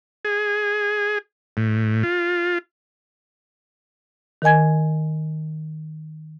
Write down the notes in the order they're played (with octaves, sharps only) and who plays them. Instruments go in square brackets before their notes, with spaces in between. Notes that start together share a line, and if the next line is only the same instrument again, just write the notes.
[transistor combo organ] G#4
A2
F4
[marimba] D#3 A#4 D#5 G#5 G#6